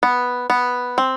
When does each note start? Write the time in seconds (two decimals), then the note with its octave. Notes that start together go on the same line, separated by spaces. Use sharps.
0.03 B3
0.50 B3
0.98 C4